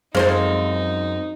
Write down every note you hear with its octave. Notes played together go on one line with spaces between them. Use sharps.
F#2 F3 G#3 C4 D#4 C5 F5